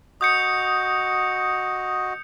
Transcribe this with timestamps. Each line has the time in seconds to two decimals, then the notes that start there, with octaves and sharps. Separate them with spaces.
0.21 F#4 D#5 D#6 G6 C#7